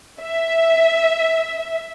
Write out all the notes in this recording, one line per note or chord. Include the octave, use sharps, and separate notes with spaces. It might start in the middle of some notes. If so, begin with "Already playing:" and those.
E5